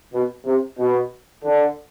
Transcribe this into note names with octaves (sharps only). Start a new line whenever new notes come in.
B2
C3
B2
D3